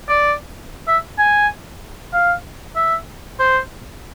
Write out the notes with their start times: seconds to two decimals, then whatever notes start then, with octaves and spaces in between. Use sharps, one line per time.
0.09 D5
0.88 E5
1.19 G#5
2.13 F5
2.76 E5
3.39 C5